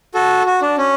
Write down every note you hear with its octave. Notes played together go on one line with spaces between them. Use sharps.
F#4 A4
F#4
D4
C#4